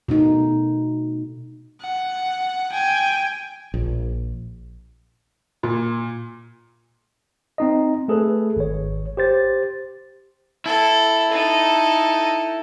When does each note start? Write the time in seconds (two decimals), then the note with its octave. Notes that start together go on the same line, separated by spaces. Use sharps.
0.08 B2 A3 D#4
1.82 F#5
2.72 G5 G#5
3.74 A#1
5.63 A#2
7.58 C4 D#4 D#5
8.08 A3 G#4 A4 B4
8.56 G#1 C#5
9.17 G4 C5 A6
10.66 E4 A4
11.31 D#4 A4